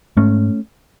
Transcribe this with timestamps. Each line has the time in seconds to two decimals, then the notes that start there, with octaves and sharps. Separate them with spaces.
0.17 G#2 A3 C#4